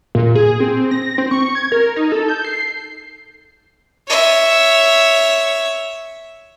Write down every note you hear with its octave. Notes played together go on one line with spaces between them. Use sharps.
A#2
G#4
C4
A#6
C4
C#6
G#6
A#4
D#4
A4
G6
C7
C#5 E5